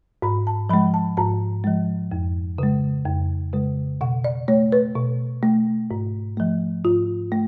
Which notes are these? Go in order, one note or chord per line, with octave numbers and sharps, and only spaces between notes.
G#2 B5
A5
F3 G#3 B5
A5
G#2 A5
F3 G#3
F2
C#3 G#3
F2
C#3 G#3
B2 F#5
D5
A3 C#5
B4
B2
A3
G#2
F3 A3
G#2 F4
A3